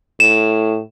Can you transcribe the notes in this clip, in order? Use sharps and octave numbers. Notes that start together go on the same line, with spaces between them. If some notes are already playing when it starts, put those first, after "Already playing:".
A2 E7